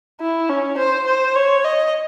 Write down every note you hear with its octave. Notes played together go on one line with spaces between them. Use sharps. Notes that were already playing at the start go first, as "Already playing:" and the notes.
E4
C#4
C5
C5
C#5
D#5